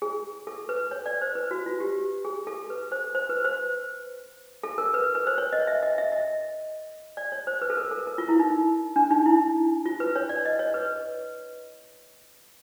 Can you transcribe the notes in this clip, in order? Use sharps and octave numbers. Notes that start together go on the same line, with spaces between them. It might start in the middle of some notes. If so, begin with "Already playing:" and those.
G#4
A4
B4
C#5
D5
C5
B4
F#4
F4
G4
G#4
A4
B4
C5
C5
B4
C5
A4
A#4
B4
B4
C5
C#5
D#5
E5
D#5
E5
D#5
D5
C#5
C5
B4
A4
A#4
A4
A#4
F4
E4
D#4
D4
D#4
E4
F4
B4
C#5
D5
D#5
C#5
B4